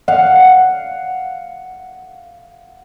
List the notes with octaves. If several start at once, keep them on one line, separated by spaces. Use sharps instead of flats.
F5 F#5